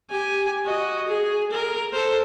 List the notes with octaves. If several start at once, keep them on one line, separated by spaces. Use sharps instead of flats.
G4 G#5
F#4 D#5
G#4
A#4
A4 C5